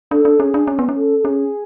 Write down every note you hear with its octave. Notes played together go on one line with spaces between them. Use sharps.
D4 A4
D4
C#4 G#4
D4
C#4
B3
C#4
A4
A4
C#4 G#4